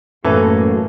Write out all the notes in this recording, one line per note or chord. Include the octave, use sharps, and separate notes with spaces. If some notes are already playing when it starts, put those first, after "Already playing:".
F#2 A2 E3 A#3 C#4 A4